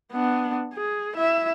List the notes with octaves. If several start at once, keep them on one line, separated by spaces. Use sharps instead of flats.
B3 D4
G#4
E4 E5